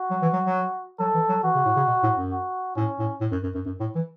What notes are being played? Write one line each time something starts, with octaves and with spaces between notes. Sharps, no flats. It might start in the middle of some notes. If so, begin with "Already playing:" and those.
Already playing: F#4
F#3
E3
F#3
F#3
F#3 A4
E3
F#3
E3 F#4
C#3
A2
C#3
B2
A2
F#2
F#4
A2 C#4
A2
A2
F#2
F#2
F#2
F#2
A2
E3